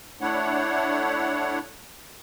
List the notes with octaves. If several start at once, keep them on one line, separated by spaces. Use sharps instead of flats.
A3 D4 E4 C#5 F#5